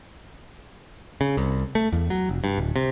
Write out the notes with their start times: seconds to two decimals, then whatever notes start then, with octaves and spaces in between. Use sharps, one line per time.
1.21 C#3
1.37 C2
1.75 A3
1.92 E2
2.10 F#3
2.29 F1
2.44 G2
2.58 D1
2.76 C3